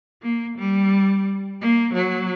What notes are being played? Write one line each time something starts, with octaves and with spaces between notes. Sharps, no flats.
A#3
G3
A#3
F#3